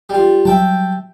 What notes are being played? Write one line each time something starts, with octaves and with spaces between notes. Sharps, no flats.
G3 F4
F#3 G3 E5 G5 A5